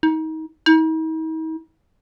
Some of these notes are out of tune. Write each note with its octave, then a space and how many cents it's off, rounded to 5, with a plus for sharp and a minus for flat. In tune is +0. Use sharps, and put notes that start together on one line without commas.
D#4 +30
D#4 +45